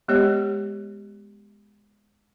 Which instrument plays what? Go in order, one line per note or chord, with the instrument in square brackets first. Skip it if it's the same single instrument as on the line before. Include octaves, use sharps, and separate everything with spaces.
[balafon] G#3 B3 G4 C#5 D#5